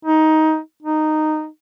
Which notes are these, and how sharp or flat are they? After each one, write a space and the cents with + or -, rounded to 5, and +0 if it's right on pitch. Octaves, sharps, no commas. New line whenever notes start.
D#4 +15
D#4 -10